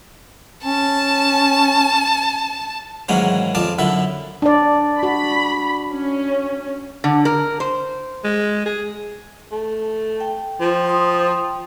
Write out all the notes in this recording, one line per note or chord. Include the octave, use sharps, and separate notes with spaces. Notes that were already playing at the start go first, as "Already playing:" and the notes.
C#4 A5
G#2 D#3 E3 F#3 A#3 C#4
F2 F4 D5 A5
F#2 D3 E4 E5
D4 D5
F#4 B5
C#4
D3
A#4
C5
G#3
G#4
A3
G5
F3
G5 C6 D#6